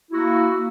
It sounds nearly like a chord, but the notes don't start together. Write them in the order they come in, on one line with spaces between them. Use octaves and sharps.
E4 F#4 A#3